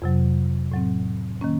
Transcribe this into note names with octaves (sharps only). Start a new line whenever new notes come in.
F2 C3 F#3
A2 F#3 C4
D#3 A#3 C#4